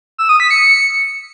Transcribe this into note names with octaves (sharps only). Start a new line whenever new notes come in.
E6
D#6
B6
C#7